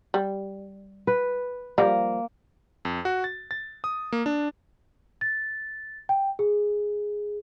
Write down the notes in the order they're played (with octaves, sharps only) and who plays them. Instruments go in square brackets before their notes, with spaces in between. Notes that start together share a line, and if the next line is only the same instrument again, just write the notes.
[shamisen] G3
[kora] B4
[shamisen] F3 G3 [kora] A#3
[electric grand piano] F2
F#4
A6
A6
D#6
A#3
D4
[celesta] A6
G5
G#4